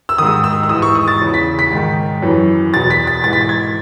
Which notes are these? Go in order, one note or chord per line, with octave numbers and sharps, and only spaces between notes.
E6
G#2 D#3 D#6
E6
E6
G#2 E3 D#6
C#6
D#6
A6
E2 C#3 E3
B6
B6
G#2 D#3
F#2 E3
E2 B2 A6
B6
A6
G#2 E3 A6
B6
A6
G#6